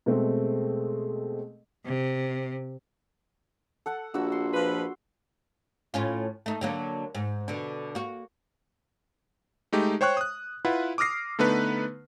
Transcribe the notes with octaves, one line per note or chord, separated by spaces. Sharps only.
B2 G#3 A3 C4
C3
A4 F#5 A5
A#1 F#4 E6
C6
F3 B4
A2 C#4 F4
A3 D#4
D3 F#3 A#3
G#2
B2 D3
A#3 F#4
G#3 A3 D#4 G4
C5 C#5 G5 C#6 F#6
D#6 F#6
E4 F4 B4 F#5
D6 D#6 F6 A#6 C7
D3 A3 B3 D#4 B4